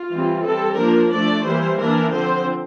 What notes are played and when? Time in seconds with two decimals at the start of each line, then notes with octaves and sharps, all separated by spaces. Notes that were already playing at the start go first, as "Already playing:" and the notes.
Already playing: F4
0.10 E3 G3 C4
0.44 G3 C4 A4
0.77 F3 A#3 D4 A#4
1.11 F3 A3 D4 D5
1.44 E3 G3 A#3 C5
1.78 E3 A#3 D4 A#4
2.11 D3 F3 C4 C5